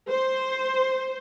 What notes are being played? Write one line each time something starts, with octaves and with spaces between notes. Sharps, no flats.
C5